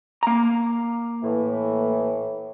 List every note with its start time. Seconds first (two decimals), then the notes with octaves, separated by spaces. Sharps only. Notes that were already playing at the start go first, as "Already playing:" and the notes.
0.23 A#3 A#5
1.23 A2 E3